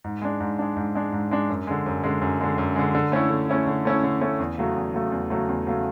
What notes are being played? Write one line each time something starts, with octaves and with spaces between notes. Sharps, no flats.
G#2
G#3 D4
G#2
G#3 D4
G#2
G#3 D4
G#2
G#3 D4
F#2
D3 G#3
F#2
D3 G#3
F#2
D3 G#3
F#2
D3 G#3
D3
A3 C#4 E4
D3
A3 C#4 E4
D3
A3 C#4 E4
D3
A3 C#4 E4
E2
C#3 F#3 A3
E2
C#3 F#3 A3
E2
C#3 F#3 A3
E2
C#3 F#3 A3